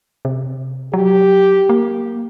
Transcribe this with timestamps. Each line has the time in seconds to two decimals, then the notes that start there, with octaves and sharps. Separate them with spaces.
0.25 C3
0.94 F#3 G4
1.69 A#3